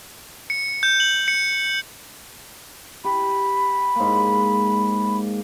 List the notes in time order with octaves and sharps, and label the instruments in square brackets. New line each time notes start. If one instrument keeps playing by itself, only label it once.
[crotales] C#7
G6
F#7
C#7
[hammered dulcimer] G4 [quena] B5
[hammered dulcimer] G#2 A#3